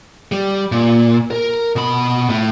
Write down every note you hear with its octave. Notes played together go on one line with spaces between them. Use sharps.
G3
A#2
A#4
B2 B5
A2